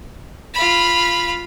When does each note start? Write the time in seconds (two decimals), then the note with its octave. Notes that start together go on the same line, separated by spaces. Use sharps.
0.54 F4 B5